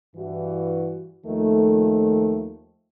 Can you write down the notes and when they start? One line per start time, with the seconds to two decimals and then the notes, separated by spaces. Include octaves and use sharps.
0.16 G2 E3 F#4
1.25 D#2 D#3 F3 A3